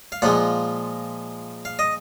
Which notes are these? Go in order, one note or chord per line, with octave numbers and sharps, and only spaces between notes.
F5
A#2 F3 G#3 F#5
F5
D#5